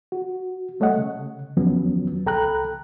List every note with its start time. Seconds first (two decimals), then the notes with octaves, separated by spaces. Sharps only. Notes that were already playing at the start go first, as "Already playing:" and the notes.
0.12 F#4
0.80 G3 A3 C#5 D#5 F#5
0.97 C#3
1.57 E2 D#3 F3 F#3 B3 C#4
2.26 C#2 A4 G5 A#5 B5 F#6